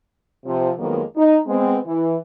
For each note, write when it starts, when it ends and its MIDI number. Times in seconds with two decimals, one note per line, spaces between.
0.46 0.71 48
0.46 0.71 53
0.79 1.01 41
0.79 1.01 51
0.79 1.01 54
0.79 1.01 56
0.79 1.01 58
0.79 1.01 59
1.16 1.38 63
1.47 1.78 56
1.47 1.78 59
1.47 1.78 60
1.86 2.16 52